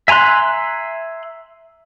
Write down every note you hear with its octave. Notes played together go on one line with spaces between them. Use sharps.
E5 G#5 A#5 C6 F#6